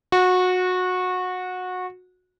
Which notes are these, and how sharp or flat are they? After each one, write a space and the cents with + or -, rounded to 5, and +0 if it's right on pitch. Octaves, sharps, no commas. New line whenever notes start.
F#4 -20